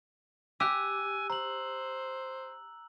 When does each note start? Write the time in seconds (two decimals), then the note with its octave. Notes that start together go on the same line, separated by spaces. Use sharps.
0.60 G4 G#5 E6 F#6
1.30 C5 A#5 F#7